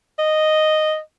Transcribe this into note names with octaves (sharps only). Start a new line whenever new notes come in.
D#5